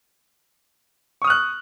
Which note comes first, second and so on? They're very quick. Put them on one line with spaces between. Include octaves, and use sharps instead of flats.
C#6 D#6 F6 F#6